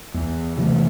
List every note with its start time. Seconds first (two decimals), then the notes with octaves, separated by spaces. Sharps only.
0.14 E2
0.57 C3 E3 A3